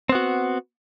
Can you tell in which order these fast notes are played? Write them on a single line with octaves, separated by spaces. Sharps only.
C4 B3 F#4